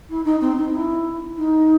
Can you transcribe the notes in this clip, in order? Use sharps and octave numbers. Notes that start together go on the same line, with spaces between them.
E4
D#4
C4
D#4
E4
D#4